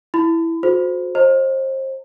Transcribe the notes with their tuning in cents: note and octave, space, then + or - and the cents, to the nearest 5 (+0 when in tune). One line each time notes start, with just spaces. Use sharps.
E4 +0 B5 +40
F#4 -35 A4 -45 C5 -10
C5 +30 D#5 +0 A#5 -40